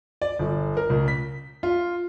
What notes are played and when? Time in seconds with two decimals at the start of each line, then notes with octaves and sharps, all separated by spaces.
0.22 D5
0.39 G1
0.77 A#4
0.90 C#2
1.08 B6
1.63 F4